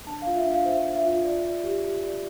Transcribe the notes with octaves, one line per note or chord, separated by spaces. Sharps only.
D4 A5
F4 F5
E5
D4
F5
C5 E5
D4
E5
F4
D5
D5
G4
G4
D5